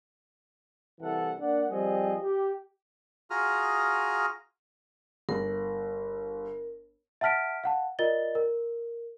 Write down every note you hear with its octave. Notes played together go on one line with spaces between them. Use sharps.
C2 E3 A4 F#5
A#3 D4 D5 F#5
F3 G3 C4 G#4 D#5
G4
F4 F#4 G#4 A#5 D#6 F6
G1 A#4
E5 F#5 A5 F6 B6 D7
F5 F#5 A5
F4 A#4 D5 D#5 A6 G7
A#4